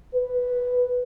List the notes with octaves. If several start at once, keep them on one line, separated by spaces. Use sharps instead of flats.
B4